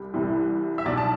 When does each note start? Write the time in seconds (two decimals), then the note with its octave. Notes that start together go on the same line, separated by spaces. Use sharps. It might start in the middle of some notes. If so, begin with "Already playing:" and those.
Already playing: C2 C3 G3
0.14 C2 C3 E3 G3
0.78 E5
0.85 B1 B2 F#3 D5
0.97 A5